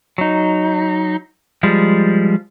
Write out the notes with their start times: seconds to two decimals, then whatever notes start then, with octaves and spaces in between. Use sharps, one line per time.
0.18 F#3 D#4
1.63 F3 G3 G#3